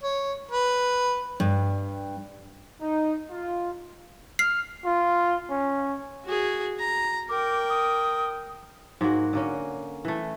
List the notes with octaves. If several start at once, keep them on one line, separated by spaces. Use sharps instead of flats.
C#5
B4
G2
D#4
F4
F6 C7
F4
C#4
F#4 G#4
A#5
A#4 G5 D6
D#6
G#2 G#3 A#3 F#4
D3 A#3 C#4
E3 A3